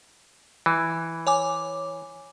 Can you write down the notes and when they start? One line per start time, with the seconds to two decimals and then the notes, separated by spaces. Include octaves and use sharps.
0.66 E3
1.27 C#5 G#5 D6